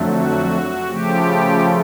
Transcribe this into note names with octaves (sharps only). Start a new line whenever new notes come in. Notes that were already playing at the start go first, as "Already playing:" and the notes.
Already playing: F2 D3 F#3 A3
F#4
C#3 F3 A3 G4